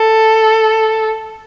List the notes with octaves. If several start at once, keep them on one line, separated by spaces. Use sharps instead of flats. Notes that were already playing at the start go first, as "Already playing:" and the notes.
Already playing: A4